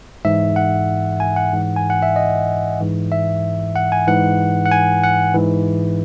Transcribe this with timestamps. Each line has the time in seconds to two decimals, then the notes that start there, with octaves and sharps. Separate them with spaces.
0.25 G#2 E3 E5
0.56 F#5
1.20 G#5
1.36 F#5
1.53 G#2 E3
1.76 G#5
1.90 F#5
2.03 E5
2.16 D#5
2.81 G#2 E3
3.12 E5
3.76 F#5
3.92 G#5
4.07 G#2 E3 F#5
4.65 F#5
4.71 G#5
5.03 F#5
5.34 G#2 E3